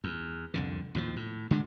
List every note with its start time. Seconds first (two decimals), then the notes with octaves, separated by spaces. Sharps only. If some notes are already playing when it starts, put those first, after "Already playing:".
0.04 E2
0.54 C2 F2 D3
0.95 D#2 A2 E3 F3
1.16 A2
1.51 D3 G#3 D4